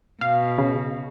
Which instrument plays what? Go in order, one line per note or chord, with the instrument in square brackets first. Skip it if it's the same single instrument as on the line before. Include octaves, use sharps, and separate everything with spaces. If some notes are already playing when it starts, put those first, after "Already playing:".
[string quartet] B2 [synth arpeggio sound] F5
[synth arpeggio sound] C#3